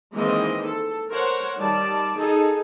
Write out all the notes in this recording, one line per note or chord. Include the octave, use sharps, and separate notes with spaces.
D#3 E3 G#3 A#3 C4 D#5
A4
A#4 C5 C#5 F#5
D#3 G3 D5 A5
D#4 G#4 A4